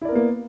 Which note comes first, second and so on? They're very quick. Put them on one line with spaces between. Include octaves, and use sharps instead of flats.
E4 D5 A#4 B3 A#3